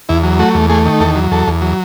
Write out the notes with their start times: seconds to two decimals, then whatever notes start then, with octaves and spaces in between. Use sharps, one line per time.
0.09 E2 E4
0.23 F#3
0.39 A3 F#4
0.55 E2
0.70 A3 G#4
0.86 D#3
1.00 E2 A4
1.16 F#3
1.31 E2 A4
1.47 E2
1.62 F#3